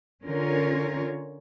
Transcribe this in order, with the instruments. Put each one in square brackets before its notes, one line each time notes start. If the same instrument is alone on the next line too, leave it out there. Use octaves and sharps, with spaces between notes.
[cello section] D3 C#4 F4 A#4